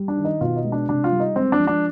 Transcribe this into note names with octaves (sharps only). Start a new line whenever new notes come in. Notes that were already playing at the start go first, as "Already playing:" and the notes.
Already playing: G3
D4
D#3
D#4
B2 F4
D#4
G#3
D4
C3 D4
F4
G3
D#4
G#3 C4
D4
F3
D4